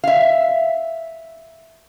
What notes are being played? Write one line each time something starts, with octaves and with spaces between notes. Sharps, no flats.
E5 F5